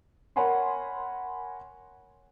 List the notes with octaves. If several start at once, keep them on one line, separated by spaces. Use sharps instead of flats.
A#4 C#5 F#5 G#5 B5 C6